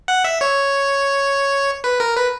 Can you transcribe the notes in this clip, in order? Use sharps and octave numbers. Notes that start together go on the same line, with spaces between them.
F#5
E5
C#5
B4
A#4
B4